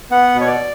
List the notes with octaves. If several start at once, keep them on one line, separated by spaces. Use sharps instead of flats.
B3 F#5
B2
C#5
D5